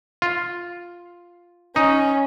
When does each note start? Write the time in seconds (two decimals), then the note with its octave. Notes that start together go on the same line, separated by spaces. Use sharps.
0.22 F4
1.76 C#4 D#4